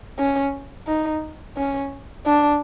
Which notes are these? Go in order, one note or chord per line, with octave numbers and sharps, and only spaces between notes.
C#4
D#4
C#4
D4